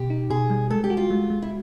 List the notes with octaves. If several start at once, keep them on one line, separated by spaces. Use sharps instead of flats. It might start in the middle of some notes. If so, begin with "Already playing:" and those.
Already playing: B2 G4
D#4
B2 G#4
G3
G#3 A4
G4
F#4
F4
G#3
G#3
E4